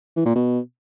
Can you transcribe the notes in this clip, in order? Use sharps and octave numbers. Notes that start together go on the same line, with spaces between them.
E3
A#2
B2